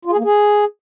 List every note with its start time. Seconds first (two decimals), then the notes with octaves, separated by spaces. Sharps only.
0.05 F4
0.12 G#4
0.18 A#3
0.24 G#4